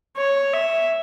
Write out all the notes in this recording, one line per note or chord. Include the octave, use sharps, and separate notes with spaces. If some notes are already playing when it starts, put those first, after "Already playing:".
C#5
E5